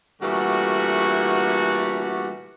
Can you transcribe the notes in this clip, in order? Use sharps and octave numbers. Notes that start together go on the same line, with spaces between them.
A#2 D3 E3 G3 A3 F#4